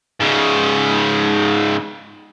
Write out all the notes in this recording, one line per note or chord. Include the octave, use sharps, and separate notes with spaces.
G#2 C#3